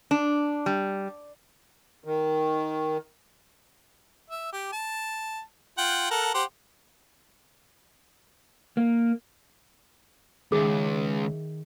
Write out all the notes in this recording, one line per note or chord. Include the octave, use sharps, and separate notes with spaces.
D4
G3
D#3
E5
G4
A5
F4 F#5 G5
A4 A#4 F#5
G4 C5 F#5
A#3
C#2 D#3 G#4 E5 C7